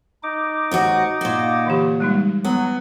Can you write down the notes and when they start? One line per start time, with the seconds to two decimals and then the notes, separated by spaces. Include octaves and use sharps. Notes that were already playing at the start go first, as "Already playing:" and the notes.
0.23 D#4 D6
0.71 D#2 G#2 F#4
1.21 A#2 F#4
1.66 D3 E3 G4
2.00 G3 G#3 D#4
2.45 F#3 B3